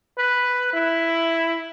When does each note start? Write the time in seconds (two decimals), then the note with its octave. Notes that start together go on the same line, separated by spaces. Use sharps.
0.18 B4
0.73 E4